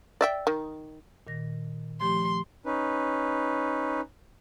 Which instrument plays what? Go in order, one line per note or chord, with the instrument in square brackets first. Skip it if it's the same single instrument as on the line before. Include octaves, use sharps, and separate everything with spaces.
[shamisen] D5 E5 G5
D#3
[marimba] A#2 D#3 A#6
[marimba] F3 A3 G4 [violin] C6
[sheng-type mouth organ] C#4 D#4 B4